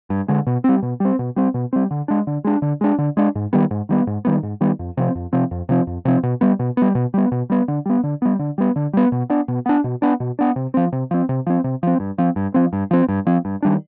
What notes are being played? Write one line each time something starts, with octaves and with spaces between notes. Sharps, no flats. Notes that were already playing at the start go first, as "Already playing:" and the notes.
G2
D3 G#3
B2
G3 C4
B2
G3 C4
B2
G3 C4
B2
G3 C4
D3
G#3 D4
D3
G#3 D4
D3
G#3 D4
D3
G#3 D4
G#2
D#3 G3 B3
G#2
D#3 G3 B3
G#2
D#3 G3 B3
G#2
D#3 G3 B3
F2
C3 F3 C4
F2
C3 F3 C4
F2
C3 F3 C4
F2
C3 F3 C4
B2
G3 B3
B2
G3 B3
B2
G3 B3
B2
G3 B3
D3
G3 B3
D3
G3 B3
D3
G3 B3
D3
G3 B3
B2
B3 D4
B2
B3 D4
B2
B3 D4
B2
B3 D4
C3
F3 C4
C3
F3 C4
C3
F3 C4
C3
F3 C4
G2
F3 C4
G2
F3 C4
G2
F3 C4
G2
F3 C4
G2
D#3 G3 D4